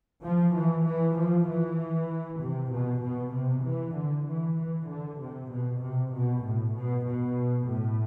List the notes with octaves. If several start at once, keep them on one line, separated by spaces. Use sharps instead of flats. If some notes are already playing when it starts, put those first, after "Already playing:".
F3
E3
E3
F3
E3
C3
B2
B2
C3
E3
D3
E3
E3
D3
C3
B2
C3
B2
A2
B2
B2
A2